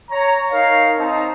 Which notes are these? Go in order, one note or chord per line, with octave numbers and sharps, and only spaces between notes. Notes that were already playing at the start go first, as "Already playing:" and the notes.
C#5 A#5
D#4 A#4 C#5 F5
C4 D#4 A5